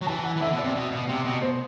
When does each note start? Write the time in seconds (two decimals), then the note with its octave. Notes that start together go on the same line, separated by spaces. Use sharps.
0.01 F#3
0.07 E3 A5
0.24 F#5
0.36 E3
0.41 D3 E5
0.53 B2
0.58 D5
0.64 C3
0.75 B2
0.91 B2
1.09 C3
1.25 B2
1.42 C5